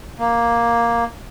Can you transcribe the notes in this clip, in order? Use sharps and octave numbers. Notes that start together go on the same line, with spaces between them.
A#3